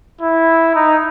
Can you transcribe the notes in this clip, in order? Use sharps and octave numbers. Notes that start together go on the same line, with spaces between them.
E4
D#4